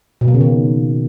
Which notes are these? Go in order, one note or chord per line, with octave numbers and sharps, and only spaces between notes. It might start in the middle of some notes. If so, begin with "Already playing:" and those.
B2
A#3
C#3
D#3